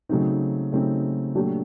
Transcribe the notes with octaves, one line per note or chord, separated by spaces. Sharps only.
C#3 F#3 A3 C4 D#4
C#3 F#3 A3 C4 D#4
A#2 F#3 A3 D4 G4